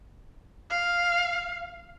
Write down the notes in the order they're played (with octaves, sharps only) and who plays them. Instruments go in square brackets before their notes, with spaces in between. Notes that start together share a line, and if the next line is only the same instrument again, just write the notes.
[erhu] F5